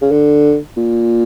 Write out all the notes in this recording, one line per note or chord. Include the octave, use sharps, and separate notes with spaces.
C#3
D3
A#2